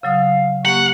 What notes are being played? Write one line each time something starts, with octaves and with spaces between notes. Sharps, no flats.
C#3 F#3 F5 D#6
A#3 G4 F#5 C#6